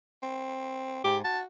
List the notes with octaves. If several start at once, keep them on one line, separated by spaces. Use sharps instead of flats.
C4
G#2 G4
F#4 A5